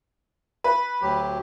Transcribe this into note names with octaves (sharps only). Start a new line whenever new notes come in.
B4
D2 F#3 G4